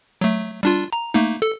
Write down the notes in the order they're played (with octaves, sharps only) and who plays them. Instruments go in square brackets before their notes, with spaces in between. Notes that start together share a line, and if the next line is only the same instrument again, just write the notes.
[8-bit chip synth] F#3 A3
G3 D4 F4
A#5
A3 A#3 D#4
A4